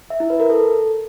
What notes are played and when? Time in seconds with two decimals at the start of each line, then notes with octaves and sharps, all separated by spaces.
0.10 E5
0.20 E4
0.30 B4
0.40 A#4
0.50 A4